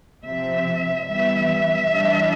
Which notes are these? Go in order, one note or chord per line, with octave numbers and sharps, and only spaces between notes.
C3 F3 C4 E5
E3 G3 B3 E5
E3 G3 D4